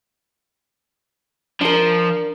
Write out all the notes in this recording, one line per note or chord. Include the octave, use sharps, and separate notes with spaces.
F3 D4 A#4